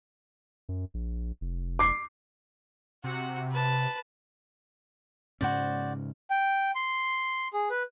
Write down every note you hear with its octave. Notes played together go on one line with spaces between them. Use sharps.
F#2
A#1
F1
D6 C7
C3 F#4 F#5
B4 A5
G#2 C#3 C#4 F#4 C5 D5
G5
C6
G#4
B4